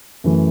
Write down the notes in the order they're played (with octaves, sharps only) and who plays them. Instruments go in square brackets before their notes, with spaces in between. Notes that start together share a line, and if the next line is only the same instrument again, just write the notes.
[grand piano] F#2 E3 A3